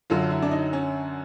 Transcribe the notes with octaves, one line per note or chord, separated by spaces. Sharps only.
F#2 D3 F#3 F4
E4
D4
D#4
C#4